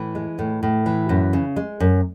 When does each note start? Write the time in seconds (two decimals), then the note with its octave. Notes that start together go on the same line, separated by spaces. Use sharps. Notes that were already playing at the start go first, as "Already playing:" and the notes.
Already playing: A2 E3
0.15 G#3
0.39 A2
0.63 A2
0.86 E3
1.09 F#2
1.33 C#3
1.56 G#3
1.80 F#2